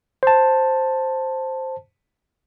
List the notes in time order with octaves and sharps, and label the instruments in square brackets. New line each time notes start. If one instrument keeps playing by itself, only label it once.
[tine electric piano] C5 A5